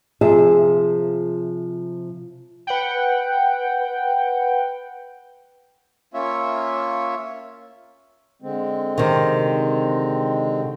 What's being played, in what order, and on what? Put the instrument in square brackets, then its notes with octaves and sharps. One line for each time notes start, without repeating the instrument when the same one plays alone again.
[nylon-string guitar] C3 F3 F4 G#4 E5
[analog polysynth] B4 F#5 G5
[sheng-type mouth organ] A#3 C#4 F4 C#5 E5
[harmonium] D3 G#3 C4
[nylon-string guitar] C3 D#3